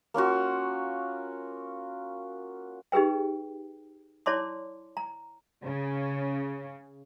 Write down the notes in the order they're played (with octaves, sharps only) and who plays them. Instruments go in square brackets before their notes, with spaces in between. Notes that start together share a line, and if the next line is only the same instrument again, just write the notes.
[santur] A#3 C#4 F4 F#4
[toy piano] D#4 G4 G#4 B4 G5
E4 C#5 D5 A5 C6 D6
A#5
[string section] C#3